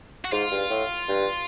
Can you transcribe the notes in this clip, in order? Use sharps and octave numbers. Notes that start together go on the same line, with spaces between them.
F#4
G#2 F4
G2
A2
G2